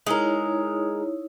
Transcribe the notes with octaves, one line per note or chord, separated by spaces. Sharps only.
G#3 D#4 E4 A#4 C#5